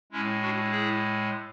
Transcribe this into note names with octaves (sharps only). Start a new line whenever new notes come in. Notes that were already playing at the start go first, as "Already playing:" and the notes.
A2 G#3 C#4 E4
D4 F#4
E4 G#4